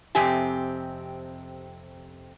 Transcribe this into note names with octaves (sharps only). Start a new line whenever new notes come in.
F2 C3 C4 G4 G#5